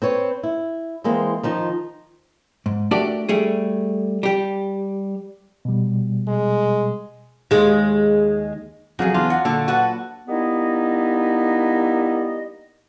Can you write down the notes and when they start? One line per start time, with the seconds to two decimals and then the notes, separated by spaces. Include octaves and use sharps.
0.02 C4 B4 C#5
0.43 E4
1.04 E3 G#3 A#3 C4
1.43 D#3 F3 D#4
2.66 G#2
2.91 A3 D4 F#4 G4 A#4 D5
3.29 G3 A3 G#4
4.23 G3 G4
5.65 B2 G3
6.28 G#3
7.51 D#2 G#3
8.99 F2 C#3 F#3 F#4 G#4
9.14 E2 D4 F4
9.30 F#4
9.45 A#2 D3 A4
9.68 F#4 B4 F#5 A5
10.28 G3 A#3 B3 D#4 E4 D#5